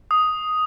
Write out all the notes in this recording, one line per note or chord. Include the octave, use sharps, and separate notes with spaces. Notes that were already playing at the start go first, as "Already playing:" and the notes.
D#6